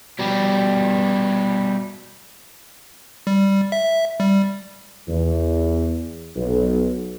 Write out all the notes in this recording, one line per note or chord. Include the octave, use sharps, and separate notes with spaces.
B2 G3
G3
E5
G3
E2
B1